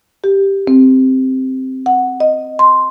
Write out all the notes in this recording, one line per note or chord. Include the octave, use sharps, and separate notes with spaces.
G4
C4
F#5
D#5
C6